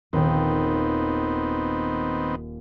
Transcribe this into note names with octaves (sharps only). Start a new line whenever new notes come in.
D#1 D#2 D#3 B3 C4